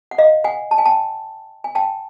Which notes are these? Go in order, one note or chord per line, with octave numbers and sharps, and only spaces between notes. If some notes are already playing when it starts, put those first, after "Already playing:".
F#5
D#5 F5
F#5 G#5
A5
G#5
G5 A5
G#5
G5 A5